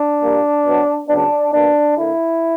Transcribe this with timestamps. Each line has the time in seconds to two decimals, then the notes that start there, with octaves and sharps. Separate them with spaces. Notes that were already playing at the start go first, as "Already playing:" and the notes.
Already playing: D4
0.21 A#2 G3 A#3
0.65 B2 F#3 B3
1.08 C#3 F#3 B3 D4
1.52 B2 A#3 D4
1.96 D3 A#3 E4